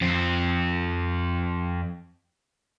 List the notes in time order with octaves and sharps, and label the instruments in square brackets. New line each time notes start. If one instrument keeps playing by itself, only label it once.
[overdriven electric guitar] F2 C4